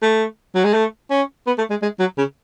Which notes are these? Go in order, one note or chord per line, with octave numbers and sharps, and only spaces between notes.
A3
F#3
G#3
A3
C#4
B3
A3
G#3
G#3
F#3
C#3